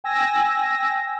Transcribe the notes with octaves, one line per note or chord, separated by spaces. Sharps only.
G5 G#5 E6 A#6